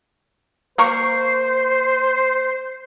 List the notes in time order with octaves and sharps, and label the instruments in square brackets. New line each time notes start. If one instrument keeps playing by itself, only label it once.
[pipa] A#3 A#4 C#6 [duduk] C5